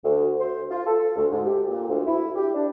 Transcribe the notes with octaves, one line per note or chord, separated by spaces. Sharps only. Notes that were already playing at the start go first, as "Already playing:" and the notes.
D2
C5
F4
A4
D2
G#2
G4
A#2
D2
E4
G4
D4